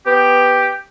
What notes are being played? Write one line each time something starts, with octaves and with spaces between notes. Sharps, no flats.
B3 G4